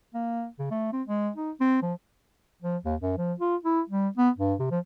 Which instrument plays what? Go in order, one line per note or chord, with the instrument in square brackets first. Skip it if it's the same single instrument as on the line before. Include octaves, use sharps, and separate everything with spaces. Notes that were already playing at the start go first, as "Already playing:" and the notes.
[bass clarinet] A#3
C#3
A3
C4
G#3
D#4
C4
F3
F3
D#2
F#2
F3
F4
E4
G3
B3
G2
C3
F3